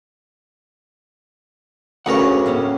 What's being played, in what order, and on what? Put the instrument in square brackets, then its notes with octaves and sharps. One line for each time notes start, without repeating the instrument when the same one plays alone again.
[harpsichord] D2 C#3 C#5 [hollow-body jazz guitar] A#4 B4 F#5
[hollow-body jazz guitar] A2 A#3 C#4